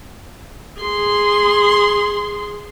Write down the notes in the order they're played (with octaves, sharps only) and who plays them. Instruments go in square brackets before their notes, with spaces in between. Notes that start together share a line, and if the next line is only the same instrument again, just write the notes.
[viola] G#4 C6